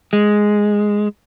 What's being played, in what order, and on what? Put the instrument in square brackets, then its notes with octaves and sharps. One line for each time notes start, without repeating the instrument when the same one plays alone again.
[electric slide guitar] G#3